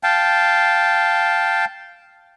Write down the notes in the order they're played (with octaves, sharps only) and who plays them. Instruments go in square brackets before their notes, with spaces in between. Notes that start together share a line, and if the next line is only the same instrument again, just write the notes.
[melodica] F5 G5 A5